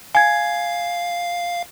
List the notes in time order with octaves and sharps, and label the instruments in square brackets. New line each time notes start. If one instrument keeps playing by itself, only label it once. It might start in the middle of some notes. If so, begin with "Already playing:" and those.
[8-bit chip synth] F5 [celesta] G#5 G#6